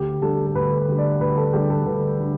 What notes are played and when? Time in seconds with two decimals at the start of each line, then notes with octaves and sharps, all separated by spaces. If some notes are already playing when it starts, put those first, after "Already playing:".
Already playing: D2 G4
0.22 D3 G3 A4
0.47 A4
0.55 D2 B4
0.88 D3 G3
0.98 D5
1.20 D2 B4
1.37 A4
1.53 D3 G3 G4
1.70 A4
1.86 D2 B4
2.19 D3